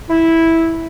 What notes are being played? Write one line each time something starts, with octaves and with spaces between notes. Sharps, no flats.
E4